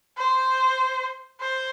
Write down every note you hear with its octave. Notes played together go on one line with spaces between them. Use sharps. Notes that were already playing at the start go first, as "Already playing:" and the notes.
C5
C5